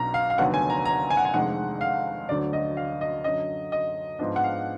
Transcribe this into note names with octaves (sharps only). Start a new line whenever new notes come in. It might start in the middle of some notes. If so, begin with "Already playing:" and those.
Already playing: B1 B2 D4 A#5
F5
F5
F1 D#2 D3 F#3 B3 F#5
G#5
A#5
A#5
G#5
F#5
G#5
F1 F2 D#3 G#3 D4 F#5
F5
D2 D3 F#3 D5
D#5
F5
D#5
F#2 D3 F#3 D#5
D#5
G#2 F3 B3 D4 D#5
F#5
F5